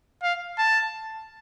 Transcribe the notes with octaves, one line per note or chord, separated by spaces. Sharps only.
F5
A5